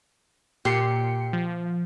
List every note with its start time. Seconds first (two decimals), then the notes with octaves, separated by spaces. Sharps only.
0.65 A#2 G4 C7 C#7
1.33 F3